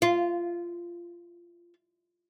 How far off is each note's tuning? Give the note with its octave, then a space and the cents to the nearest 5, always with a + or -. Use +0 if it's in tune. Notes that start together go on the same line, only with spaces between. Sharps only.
F4 -15